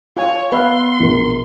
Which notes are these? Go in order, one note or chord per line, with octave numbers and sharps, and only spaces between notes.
F4 C#5 G#5
B3 B4 E5 F5 C6
A#1 B2 A#4